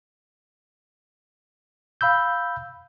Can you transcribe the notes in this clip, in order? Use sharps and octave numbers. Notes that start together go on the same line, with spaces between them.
F5 B5 E6 G6